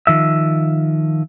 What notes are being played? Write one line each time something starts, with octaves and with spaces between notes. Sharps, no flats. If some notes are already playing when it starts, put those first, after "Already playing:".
D#3 F3 E5